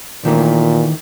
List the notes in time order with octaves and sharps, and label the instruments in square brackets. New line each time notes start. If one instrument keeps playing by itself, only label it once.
[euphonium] A#2 [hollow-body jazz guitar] D#3 E3 A3